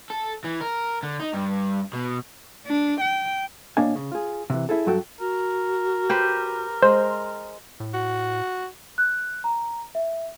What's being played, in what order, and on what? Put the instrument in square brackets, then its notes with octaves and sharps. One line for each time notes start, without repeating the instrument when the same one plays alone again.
[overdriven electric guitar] A4
E3
A#4
D3
D#4
G2
B2
[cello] D4
G5
[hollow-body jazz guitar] B2 A#3 D4 C#5 D#5 G#5
C#3
F4 G#4
C3 E3
E4 G#4 A4
G2 F#3 F#4 A4 G5
[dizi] F#4 [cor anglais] A#4
[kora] G4 B4 C5
[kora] G#3 [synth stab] C5
[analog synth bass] A2
[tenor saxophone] F#4
[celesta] F#6
A#5
E5